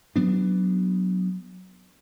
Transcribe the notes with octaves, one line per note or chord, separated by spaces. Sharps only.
F#3 B3 D4